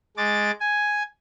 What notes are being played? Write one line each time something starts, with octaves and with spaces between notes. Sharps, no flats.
G#3 D6 A6
G#5